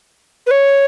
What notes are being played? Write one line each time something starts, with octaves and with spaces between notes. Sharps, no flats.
B4
C#5